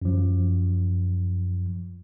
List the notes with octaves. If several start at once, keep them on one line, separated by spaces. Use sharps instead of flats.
F#2 F3